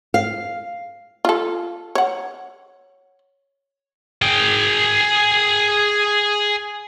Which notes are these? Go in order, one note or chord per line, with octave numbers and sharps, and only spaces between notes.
F5
F4 A4
C#5 F#5
G#4 G5